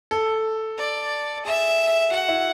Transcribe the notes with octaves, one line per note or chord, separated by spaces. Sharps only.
A4
D5
G#4 E5
F#4 F#5
E4